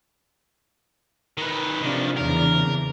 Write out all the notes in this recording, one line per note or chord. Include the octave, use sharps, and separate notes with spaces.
D#3 B4
C3 D#3 F3 D4
E2 C#3 D4 A#4